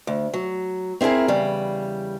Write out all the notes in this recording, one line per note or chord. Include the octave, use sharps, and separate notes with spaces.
D2
F#3
C4 E4 G4 G#4 A#4
E2 C#3 G3